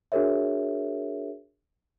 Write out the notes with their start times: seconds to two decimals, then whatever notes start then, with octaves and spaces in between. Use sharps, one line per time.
0.12 D4 F#4 G#4 A#4 C#5 E5